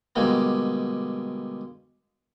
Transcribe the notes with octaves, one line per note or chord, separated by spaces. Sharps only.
B2 D3 G3 G#3 A#3